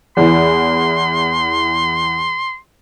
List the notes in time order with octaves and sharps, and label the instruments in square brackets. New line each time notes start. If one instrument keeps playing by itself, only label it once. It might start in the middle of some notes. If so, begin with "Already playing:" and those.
[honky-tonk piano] E2 E3 [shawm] C6